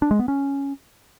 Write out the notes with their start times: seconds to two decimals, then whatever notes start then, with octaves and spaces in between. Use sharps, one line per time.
0.02 D4
0.11 G#3
0.19 B3
0.28 C#4